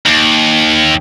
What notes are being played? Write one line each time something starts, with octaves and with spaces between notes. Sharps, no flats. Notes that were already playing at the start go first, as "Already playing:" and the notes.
D#2